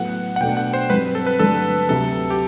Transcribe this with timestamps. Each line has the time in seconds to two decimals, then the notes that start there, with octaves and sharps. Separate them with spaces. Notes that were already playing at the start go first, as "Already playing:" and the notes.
Already playing: A2 F#3 B3 F#5
0.36 F#5
0.41 B2 A3 D4 G5
0.57 F#5
0.74 C5
0.90 G2 F#3 C4 B4
1.15 A4
1.26 B4
1.39 G2 D3 F#3 A3 A4
1.88 D2 C3 F#3 A4
2.30 G4